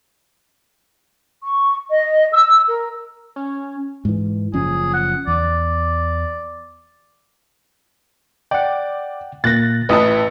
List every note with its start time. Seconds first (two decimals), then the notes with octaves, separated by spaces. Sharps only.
1.44 C#6
1.89 D#5
2.32 E6
2.68 A#4
3.36 C#4
4.05 G#2 E3
4.54 F#1 F3 C#4 G#4
4.94 F#5
5.27 E2 D5
8.51 D5 F#5 G5
9.44 A#2 A#3 F#6 A6 A#6
9.89 A1 E4 B4 E5 A5 D#6